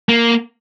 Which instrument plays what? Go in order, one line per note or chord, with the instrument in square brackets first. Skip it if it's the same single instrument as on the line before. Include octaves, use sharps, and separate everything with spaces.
[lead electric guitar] A#3